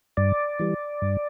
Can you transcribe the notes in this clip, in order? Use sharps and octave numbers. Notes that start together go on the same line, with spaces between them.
G2 D5
E3 G3
G2